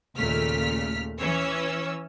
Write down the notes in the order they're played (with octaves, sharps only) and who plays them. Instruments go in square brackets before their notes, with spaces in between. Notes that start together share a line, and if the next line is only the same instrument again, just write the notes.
[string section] D#2 A#2 C#3 A3 F6 B6
E3 C#4 C#5 E6